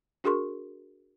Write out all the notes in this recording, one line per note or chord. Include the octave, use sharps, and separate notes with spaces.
D4 F#4 G#4 A#4 C6 C#6